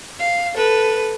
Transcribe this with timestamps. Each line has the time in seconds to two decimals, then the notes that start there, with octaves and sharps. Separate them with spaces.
0.19 F5
0.54 A4 B4